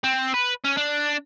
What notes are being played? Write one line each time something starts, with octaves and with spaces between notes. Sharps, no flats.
C4
B4
C#4
D4